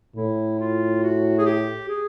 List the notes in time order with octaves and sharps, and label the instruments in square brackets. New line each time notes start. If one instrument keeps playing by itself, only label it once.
[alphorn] A2 [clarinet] E4
[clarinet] F4
F#4
G#4
G4
G#4